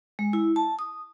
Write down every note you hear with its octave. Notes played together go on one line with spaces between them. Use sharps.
G#3
E4
A5
D#6